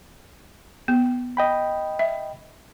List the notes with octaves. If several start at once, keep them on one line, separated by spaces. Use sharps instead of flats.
B3
D#5 G5 B5
E5